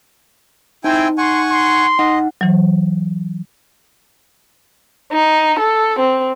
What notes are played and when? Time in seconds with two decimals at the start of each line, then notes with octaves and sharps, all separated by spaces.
0.84 C4 D#4 E4 G5 G#5
1.18 F#5 G#5 C6 C#6
1.49 C6
1.99 D#4 D#5 F#5
2.41 E3 F#3
5.12 D#4
5.59 A4
5.99 C4